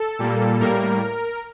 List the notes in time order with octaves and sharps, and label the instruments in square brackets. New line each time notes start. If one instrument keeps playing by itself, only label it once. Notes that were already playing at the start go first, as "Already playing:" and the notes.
Already playing: [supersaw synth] A4
A#2 G3 A#3
A2 G3 A#3 A#4